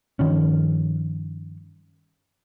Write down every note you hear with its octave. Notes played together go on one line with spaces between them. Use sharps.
G2 D#3 F3 C#4